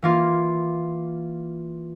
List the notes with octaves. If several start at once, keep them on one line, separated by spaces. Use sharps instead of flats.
E3 A#3 F4